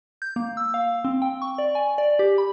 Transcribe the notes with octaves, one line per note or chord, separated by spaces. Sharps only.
G6
A#3
E6
F5
C4
G5
C#6
D5
G#5
D5
G4
B5